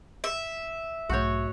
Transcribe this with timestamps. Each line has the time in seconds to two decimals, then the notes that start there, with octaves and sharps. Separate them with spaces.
0.24 E5
1.09 B1 G#2 A3 F#4 C#5 G6